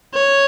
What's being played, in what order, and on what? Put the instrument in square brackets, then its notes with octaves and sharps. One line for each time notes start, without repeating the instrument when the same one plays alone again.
[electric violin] C#5